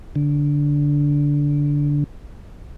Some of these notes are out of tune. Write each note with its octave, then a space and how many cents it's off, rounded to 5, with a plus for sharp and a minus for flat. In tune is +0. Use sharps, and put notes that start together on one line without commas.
D3 -15